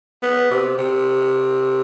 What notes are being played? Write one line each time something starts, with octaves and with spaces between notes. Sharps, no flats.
B3
C3
C3